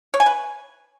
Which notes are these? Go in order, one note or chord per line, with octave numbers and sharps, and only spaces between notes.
C#5
G#5
B4